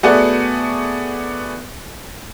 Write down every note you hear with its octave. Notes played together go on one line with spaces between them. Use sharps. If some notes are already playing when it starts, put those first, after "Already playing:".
A3 B3 F#4 G#4 D5 F#5